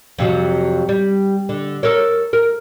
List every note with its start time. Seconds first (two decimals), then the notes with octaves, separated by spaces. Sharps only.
0.19 F2 C3 F#3
0.89 G3
1.49 D3
1.83 A4 A#4 C#5
2.33 A#4